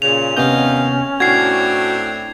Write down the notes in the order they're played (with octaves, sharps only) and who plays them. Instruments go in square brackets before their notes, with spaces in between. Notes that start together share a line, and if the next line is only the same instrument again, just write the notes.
[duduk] A#2 [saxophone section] C#3 [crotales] F7
[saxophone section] D#2 D#5 F5 [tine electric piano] C3 B3 G6 [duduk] C#4
[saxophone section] A2 C4 D4 [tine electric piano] F#4 [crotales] G#6 C7